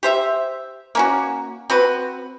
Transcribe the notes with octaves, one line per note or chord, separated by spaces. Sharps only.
G4 C5 E5
A#3 C#4 F#4
C4 F#4 B4